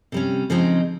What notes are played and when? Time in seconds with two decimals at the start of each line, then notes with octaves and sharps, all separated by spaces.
0.12 C3 G3 C#4
0.50 C#3 F3 G#3 C4 D#4